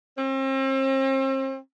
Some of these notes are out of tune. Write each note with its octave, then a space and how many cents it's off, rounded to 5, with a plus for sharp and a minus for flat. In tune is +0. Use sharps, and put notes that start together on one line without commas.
C4 +40